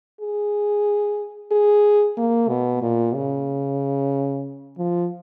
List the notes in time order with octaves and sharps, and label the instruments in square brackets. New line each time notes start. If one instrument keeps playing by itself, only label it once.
[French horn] G#4
G#4
A#3
B2
A#2
C#3
F3